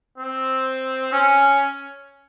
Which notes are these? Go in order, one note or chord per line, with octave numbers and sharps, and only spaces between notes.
C4
C#4